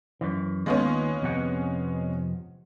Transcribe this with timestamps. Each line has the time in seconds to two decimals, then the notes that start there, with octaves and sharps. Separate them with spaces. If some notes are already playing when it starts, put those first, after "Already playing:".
0.21 F#2 E3
0.66 D#2 G#3 B3 C#4 F4
1.22 F2 C3 F#5